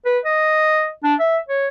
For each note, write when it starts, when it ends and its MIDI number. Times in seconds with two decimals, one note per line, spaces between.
0.05 0.19 71
0.25 0.89 75
1.04 1.14 62
1.20 1.38 76
1.49 1.68 73